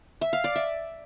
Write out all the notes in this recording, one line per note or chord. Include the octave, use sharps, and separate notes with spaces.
E5
F5
D5
E5